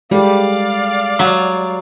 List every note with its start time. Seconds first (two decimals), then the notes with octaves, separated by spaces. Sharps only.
0.11 G3 G#3 A4 D5 F5
1.19 F#3